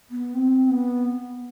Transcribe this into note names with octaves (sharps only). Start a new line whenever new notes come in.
B3
C4
B3